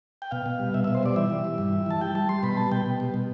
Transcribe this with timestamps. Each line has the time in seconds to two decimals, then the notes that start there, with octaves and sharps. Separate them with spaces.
0.22 G5
0.31 B2 F5
0.46 B2
0.60 G3
0.74 B2 E5
0.84 B2 E5
0.95 C5
1.03 G3 D5
1.16 E3 E5
1.30 E3
1.44 G3
1.58 G2
1.73 E3
1.86 E3 A5
2.01 G3 G5
2.15 G3 A5
2.29 G3 C6
2.43 B2 B5
2.57 G3 A5
2.72 B2 G5
2.86 B2
3.00 G3
3.14 B2